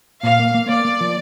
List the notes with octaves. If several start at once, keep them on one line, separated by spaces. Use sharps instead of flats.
A#2 F5
A#3
A#3
A#3 D5
A#3
F3